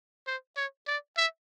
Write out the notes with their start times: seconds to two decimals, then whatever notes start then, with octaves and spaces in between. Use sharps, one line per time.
0.27 C5
0.57 C#5
0.87 D5
1.17 E5